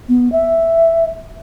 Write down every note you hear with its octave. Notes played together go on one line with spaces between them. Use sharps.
B3
E5